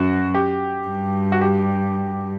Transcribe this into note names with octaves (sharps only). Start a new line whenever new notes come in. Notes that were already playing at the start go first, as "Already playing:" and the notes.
Already playing: F#2 F#4
G4
G2
F#4
G4